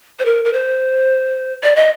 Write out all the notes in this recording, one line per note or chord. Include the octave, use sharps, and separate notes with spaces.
C5
A#4
A#4
C5
D5
D#5